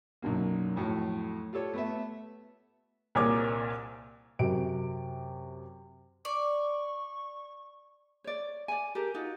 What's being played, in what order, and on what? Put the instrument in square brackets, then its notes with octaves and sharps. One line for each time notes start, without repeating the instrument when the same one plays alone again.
[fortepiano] B1 F#2 D3 A#3
F2 A2 F#3 A3
F4 G4 A4 C#5
A3 B3 E5
[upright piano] C2 A#2 G#4 A#4 C#5 D6
F#2 C3 D7
[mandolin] D5 [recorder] C#6
[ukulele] C#5 D5
D5 G#5
G4 A4 A#4
D#4 F4 F#4